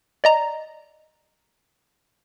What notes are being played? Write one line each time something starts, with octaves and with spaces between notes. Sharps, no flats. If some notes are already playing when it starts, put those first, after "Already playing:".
D5 D#5 A#5